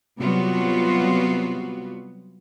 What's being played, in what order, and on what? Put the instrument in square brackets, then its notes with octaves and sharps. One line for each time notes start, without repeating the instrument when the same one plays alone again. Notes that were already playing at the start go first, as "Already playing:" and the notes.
[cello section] C3 F#3 G3 B3 F4 F#4